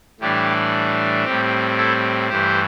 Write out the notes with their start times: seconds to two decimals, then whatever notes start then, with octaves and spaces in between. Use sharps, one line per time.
0.20 A2 E3 G3 D4 G4
1.25 A2 G3 C4 G4
1.77 E4 A4
2.29 G2 E3 A3 G4 C5